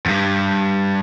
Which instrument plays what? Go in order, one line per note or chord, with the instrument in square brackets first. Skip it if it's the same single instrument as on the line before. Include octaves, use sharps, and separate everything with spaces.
[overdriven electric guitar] E2 G2